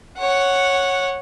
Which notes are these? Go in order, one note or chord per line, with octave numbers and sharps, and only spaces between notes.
C#5 F#5